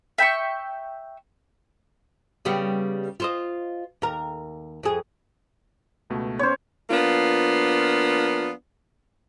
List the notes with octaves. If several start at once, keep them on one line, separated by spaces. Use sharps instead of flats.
E5 G5 B5 C#6
C#3 G3 B3
F4 C5 D#5
D#2 A#4
F2 G#4
C#2 B2 A3
B3 C#4 C5 C#5
F3 A#3 B3 D4 F4